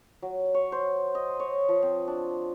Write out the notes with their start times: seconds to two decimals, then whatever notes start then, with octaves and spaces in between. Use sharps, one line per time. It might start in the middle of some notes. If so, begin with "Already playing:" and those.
0.22 F#3
0.54 C#5
0.72 C5
1.15 D#5
1.40 C#5
1.69 F3
1.83 C4
2.08 D4